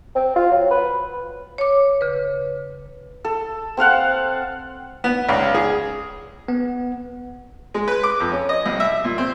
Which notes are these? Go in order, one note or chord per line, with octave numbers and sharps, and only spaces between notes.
C4
F4
F#3
B4
C#5 D6
C#3 B4
A4
C4 A4 F5 F#5
B3
C#2
G#4
B3
G#3
B4
D6
F2
C#4
D#5
C2
E5
A#2
C4